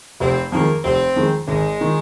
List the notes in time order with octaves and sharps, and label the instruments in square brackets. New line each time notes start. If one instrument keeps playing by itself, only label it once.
[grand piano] F1 [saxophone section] C4
[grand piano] F2 D#3 G#3 [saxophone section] A#3
[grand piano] F1 [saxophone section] C4
[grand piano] F2 D#3 G#3
[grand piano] G#1 [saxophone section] G#3
[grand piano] D#3